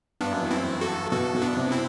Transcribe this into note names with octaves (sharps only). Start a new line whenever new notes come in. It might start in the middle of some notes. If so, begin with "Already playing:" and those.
G2 B3 D4
F#2
E2
F#2 C4 E4
F#4 A4
B2 F#4 A4
B2
B3 D4
C3
C4 E4